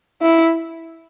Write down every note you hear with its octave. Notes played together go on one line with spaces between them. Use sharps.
E4